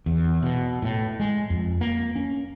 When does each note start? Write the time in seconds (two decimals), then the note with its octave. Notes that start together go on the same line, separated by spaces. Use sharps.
0.06 E2
0.43 B2
0.82 A2
1.20 G#3
1.50 F2
1.81 A#3
2.16 C#4